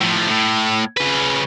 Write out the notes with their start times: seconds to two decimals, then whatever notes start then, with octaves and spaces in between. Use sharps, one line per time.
0.01 A2 F3
0.30 A2
0.97 C#3 B4